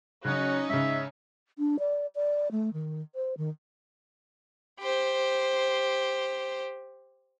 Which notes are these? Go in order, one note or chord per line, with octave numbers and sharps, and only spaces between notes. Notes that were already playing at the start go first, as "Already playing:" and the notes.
C#3 F#3 C#4 D#4 F#4
G#2 C#3 E5
D4
D5
D5
A3
D#3
C5
D#3
G4 C5